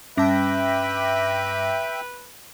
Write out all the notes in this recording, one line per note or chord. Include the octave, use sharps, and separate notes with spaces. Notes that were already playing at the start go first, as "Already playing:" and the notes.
G2 C#4 B4 E5 G5 A5 D6 A#6